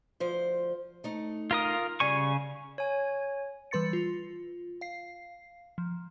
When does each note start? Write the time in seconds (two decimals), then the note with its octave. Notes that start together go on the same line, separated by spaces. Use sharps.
0.20 D2 F3 C5
1.04 A3 D#4
1.51 F4 A#4 D#6
2.00 C#3 G3 G#5 C#6
2.78 C#5 G#5
3.71 E3 G3 B4 C6 A6 C#7
3.93 F4
4.81 F5 C7
5.78 F3